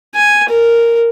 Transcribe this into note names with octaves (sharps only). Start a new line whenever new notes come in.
G#5
A#4